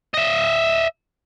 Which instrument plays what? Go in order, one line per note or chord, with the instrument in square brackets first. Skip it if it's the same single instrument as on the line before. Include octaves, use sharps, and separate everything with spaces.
[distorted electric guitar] D#5 E5